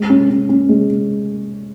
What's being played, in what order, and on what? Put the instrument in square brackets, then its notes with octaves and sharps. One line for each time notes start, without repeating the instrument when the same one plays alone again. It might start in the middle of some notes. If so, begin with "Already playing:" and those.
Already playing: [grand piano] G#3
C#4
C#4
C#4
G#3